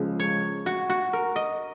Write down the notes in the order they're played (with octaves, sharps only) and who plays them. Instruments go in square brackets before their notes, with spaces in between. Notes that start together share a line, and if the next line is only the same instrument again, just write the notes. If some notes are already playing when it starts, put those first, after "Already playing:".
Already playing: [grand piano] C#2 C#3 F3 G#3
[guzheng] C#5
F#4
F#4
A#4
D#5